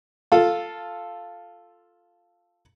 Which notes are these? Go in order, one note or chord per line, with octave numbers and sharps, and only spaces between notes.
F4 A4